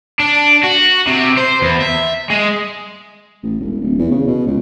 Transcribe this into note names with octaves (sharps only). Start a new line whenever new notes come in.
D4
F#4
C3
C5
E2
E5
G#3
A1
E1
D1
E2
C#3
B2
C#2